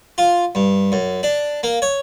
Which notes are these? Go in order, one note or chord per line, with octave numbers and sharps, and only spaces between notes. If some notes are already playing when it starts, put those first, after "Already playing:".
F4
G2
F#2
D4
A#3
C#5